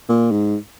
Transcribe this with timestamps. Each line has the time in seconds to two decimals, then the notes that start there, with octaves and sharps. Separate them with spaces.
0.09 A#2
0.32 G#2